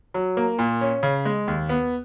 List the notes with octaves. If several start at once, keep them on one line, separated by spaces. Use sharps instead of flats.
F#3
A#3
A#2
C#4
C#3
G#3
D#2
B3